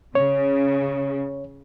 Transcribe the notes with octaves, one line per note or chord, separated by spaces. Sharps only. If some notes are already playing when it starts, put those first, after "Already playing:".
C#3 C#5